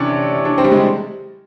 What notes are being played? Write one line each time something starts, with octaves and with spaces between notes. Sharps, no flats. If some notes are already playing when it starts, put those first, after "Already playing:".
Already playing: C3 E3 C#4 D4
D4
C4
G3
G#3